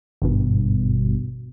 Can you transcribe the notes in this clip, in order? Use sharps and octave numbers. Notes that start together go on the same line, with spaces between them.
G#1 G2 B2